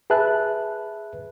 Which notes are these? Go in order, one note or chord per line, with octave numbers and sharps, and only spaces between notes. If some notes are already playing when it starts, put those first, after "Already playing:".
G#4 B4 E5 A5 F#6